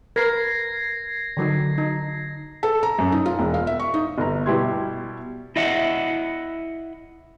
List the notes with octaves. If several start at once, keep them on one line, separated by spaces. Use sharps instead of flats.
A#4 B4 G#6 A#6 C7
D3 F#3 D#4
D#4
A4
A#5
F#2
D#4
F4
E1
F5
E5
C#6
D#4
G1 A#5
B2 G3 E4 G4 C6 G#6
E4 D#5 E5 F#5